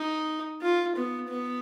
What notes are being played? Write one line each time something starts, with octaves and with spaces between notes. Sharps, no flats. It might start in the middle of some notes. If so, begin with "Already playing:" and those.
Already playing: D#4
F4
B3
B3